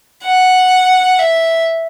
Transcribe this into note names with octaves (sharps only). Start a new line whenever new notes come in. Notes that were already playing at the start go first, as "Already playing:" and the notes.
F#5
E5